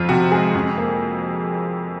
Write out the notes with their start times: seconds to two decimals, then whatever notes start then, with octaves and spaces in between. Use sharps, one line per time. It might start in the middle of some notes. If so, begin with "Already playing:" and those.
Already playing: F2 F3 F4
0.09 C3 F#4
0.32 G#3 G#4
0.54 F2
0.77 A#3